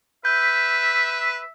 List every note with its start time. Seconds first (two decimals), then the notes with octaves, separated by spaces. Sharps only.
0.25 B4 E5 G6